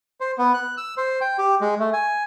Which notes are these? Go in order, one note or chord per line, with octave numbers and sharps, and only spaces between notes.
C5
B3
F#6
E6
C5
G5
G4
G#3
A3
G#5